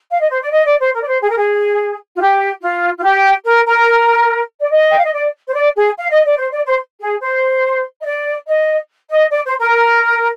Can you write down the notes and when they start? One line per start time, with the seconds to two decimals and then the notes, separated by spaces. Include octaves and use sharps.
0.11 F5
0.20 D#5
0.31 C5
0.41 D5
0.52 D#5
0.66 D5
0.80 C5
0.94 A#4
1.02 D5
1.07 C5
1.21 G#4
1.29 A#4
1.37 G#4
2.14 F4
2.19 G4
2.61 F4
2.99 F4
3.03 G4
3.45 A#4
3.66 A#4
4.60 D5
4.70 D#5
4.90 G5
4.98 F5
5.05 D#5
5.12 D5
5.47 C5
5.54 D5
5.75 G#4
5.97 F5
6.11 D#5
6.24 D5
6.38 C5
6.51 D5
6.65 C5
7.00 G#4
7.21 C5
8.00 D#5
8.05 D5
8.47 D#5
9.10 D#5
9.30 D5
9.44 C5
9.59 A#4